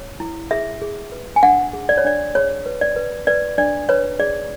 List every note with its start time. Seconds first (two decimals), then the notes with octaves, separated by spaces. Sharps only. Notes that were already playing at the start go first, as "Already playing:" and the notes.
Already playing: C#5
0.20 E4
0.51 G#4 E5
0.82 G#4
1.12 B4
1.36 G#5
1.43 D4 F#5
1.73 G#4
1.89 D5
1.98 C#5
2.05 D4 D5
2.35 G#4 C#5
2.66 B4
2.81 D5
2.96 B4
3.27 B4 D5
3.58 D4 D5
3.89 B4 C#5
4.20 G#4 D5